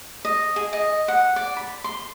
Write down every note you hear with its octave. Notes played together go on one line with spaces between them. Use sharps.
D#5
G#4
D#5
F#5
D5
B5
C6